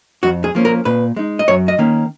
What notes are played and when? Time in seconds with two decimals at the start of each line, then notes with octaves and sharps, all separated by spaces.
0.23 F2 F#4
0.44 G#4
0.55 F3 A#3 C#4
0.65 A#4
0.85 A#2 B4
1.16 G#3 D#4
1.39 D#5
1.48 F#2 C#5
1.68 D#5
1.78 D#3 A#3 C#4